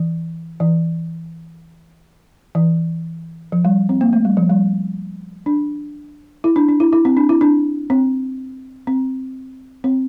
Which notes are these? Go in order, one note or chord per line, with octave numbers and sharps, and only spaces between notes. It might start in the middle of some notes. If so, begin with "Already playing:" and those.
Already playing: E3
E3
E3
F3
G3
C4
A#3
A3
G3
F3
G3
D4
E4
D4
D4
E4
E4
C4
D4
E4
D4
C4
C4
C4